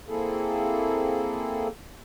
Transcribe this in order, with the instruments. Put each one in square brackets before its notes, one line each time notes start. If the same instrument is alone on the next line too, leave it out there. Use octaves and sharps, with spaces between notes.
[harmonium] A#3 C4 E4 G#4 A4